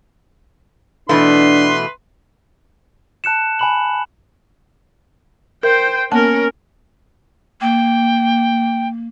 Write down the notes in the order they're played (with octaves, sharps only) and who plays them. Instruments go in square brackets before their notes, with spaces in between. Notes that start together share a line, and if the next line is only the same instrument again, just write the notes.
[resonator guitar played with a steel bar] B2 E3 A3 [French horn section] D4 [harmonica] B4 C6
[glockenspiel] A5 F#6 C#7 E7
G#5 B5 F#7
[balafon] A#4 [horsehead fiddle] C5 G5
[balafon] A#3 B3 A5 [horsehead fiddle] C#4 A#4
[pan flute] A#3 [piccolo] G5